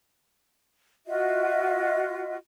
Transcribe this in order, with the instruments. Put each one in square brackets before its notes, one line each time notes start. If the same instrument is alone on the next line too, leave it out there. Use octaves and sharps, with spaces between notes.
[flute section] F4 F#4 D#5 E5